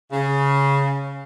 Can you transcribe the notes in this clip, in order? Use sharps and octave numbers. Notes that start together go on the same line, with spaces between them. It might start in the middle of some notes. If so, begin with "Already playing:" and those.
C#3